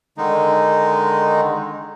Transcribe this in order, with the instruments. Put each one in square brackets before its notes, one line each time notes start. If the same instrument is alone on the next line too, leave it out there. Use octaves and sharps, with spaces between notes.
[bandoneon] D3 D#3 G#3 D#4